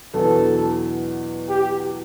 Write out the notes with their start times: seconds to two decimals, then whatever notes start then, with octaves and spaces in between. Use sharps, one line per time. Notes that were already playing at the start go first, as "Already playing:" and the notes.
0.14 E2 B2 F#3 B3 D4 A4
1.49 G4